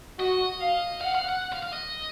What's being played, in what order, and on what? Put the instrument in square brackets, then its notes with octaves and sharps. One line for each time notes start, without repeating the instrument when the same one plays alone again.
[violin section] F#4 [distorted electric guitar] D#5
[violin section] F5
[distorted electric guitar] F5 [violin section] F#5
[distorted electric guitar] F5
F#5
F5
F5
D#5